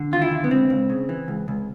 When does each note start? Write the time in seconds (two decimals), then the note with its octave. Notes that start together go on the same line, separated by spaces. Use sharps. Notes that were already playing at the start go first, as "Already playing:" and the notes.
Already playing: D3
0.12 D#2 F4
0.22 E4
0.31 D3
0.44 B3
0.50 C#2 C4
0.70 C#2
0.90 C#3
1.09 E3
1.28 C#2
1.48 C#2